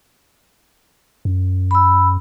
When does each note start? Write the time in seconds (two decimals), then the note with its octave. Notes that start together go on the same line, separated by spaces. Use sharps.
1.25 F#2
1.71 B5 E6